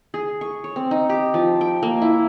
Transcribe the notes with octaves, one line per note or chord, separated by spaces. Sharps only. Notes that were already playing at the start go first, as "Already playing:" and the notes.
G#4
C#6
C#5
C4
D#4
G4
F3
G5
A#3
E4